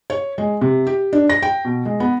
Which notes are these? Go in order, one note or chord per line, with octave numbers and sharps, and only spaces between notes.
C#5
G#3
C3
G4
D4
A#6
G5
B2
G#3
B3